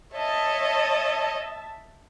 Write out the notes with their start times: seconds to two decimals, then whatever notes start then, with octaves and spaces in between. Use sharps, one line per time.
0.13 C#5 D#5 E5 A5